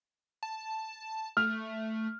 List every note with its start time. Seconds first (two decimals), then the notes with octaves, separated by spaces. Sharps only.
0.43 A5
1.37 A3 F6